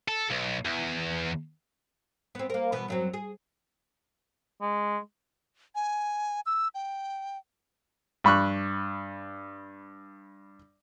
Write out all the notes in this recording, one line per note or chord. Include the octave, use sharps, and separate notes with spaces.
A4
B1
E2
B3 C4
A#3 A#4
B2 E3 B3
F#2 F#3 C4
G#4
G#3
G#5
E6
G5
G2 B5 C#6 F#6